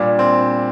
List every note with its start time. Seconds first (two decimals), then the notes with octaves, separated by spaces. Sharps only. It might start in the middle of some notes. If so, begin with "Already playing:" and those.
Already playing: A#2 G3 D4
0.19 C4